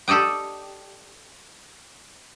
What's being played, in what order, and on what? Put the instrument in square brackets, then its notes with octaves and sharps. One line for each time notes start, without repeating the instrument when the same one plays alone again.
[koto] G4 A4 D5 D#5 G5